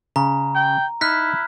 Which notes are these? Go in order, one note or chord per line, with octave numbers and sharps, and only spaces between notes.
C#3 A#5
G5
D#4 E4 F6 F#6 B6